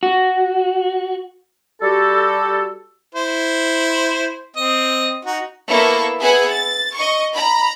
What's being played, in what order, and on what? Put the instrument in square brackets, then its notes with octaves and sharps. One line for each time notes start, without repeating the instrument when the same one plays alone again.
[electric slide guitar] F#4
[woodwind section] G3 F#4 G4 A4
[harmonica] E4 C5
C4 D#5
D#4 F#4
[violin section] A#3 B3 E4 A4 E5 C#6
B3 G#4 E5 F#5 G#5
A6
D#5 C#6
A#5 B5